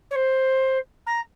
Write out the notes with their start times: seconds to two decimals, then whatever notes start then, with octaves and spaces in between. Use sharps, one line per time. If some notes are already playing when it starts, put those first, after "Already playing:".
0.10 C#5
0.15 C5
1.06 A#5